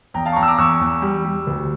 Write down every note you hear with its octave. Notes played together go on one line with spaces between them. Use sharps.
E2 G5 A#5
F5 A5
C#6
E2 G5 A#5
E6
A#5 D6
E2 C#6 E6
E2
G3
G3
D2